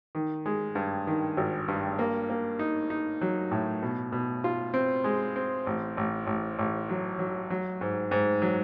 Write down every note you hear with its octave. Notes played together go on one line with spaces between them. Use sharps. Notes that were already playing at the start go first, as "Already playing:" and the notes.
D#3
G#3
G2
D#3
G#1
G2
A#3
A#3
D#4
D#4
F#3
A2
B2
B2
F4
C4
G#3
C4
A1
A1
A1
A1
F#3
F#3
F#3
G#2
G#2
F#3